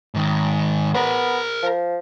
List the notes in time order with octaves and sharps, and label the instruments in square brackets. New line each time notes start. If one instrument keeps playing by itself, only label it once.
[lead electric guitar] G#2 D#3
[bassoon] B3 [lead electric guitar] A#4 C5
[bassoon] F3